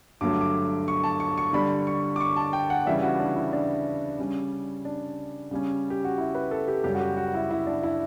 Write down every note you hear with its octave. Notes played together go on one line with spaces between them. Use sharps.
G2 D3 F#3 A3 D6
D6
C#6
A5
C#6
C#6
D3 G3 D4 B5
C#6
D6
C#6
A5
G5
F#5
C#3 E3 G3 D4 E5
F#4
D4
E4
D4
C#3 G3 C#4
D4
C#3 G3 C#4
G4
F#4
E4
B4
A4
G4
F#2 C#3 G3 G4
F#4
G4
F#4
E4
E4
D4
E4